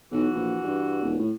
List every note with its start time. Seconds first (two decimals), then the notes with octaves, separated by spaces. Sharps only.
0.12 B1 E3 F#4
0.35 A#1
0.63 G2
1.03 D#1
1.19 A2